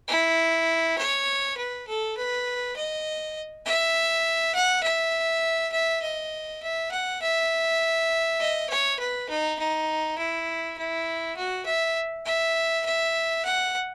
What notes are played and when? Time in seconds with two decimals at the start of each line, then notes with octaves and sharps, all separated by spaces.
0.08 E4
0.98 C#5
1.57 B4
1.87 A4
2.17 B4
2.76 D#5
3.65 E5
4.55 F#5
4.83 E5
5.72 E5
6.02 D#5
6.62 E5
6.91 F#5
7.22 E5
8.40 D#5
8.70 C#5
8.99 B4
9.29 D#4
9.59 D#4
10.18 E4
10.78 E4
11.37 F#4
11.66 E5
12.26 E5
12.86 E5
13.45 F#5